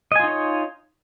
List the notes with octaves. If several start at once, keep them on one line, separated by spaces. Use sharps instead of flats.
D#4 F4 C#5 D#5 G#5